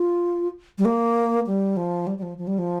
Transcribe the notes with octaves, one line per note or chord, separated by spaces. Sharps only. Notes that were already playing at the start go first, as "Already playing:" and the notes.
Already playing: F4
G3
A#3
G3
F3
G3
G3
F3
F3
G3
F3